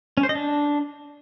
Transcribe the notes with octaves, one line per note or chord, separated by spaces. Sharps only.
C#4
C5
D#5
D4